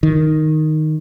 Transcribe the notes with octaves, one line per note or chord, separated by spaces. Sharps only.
D#3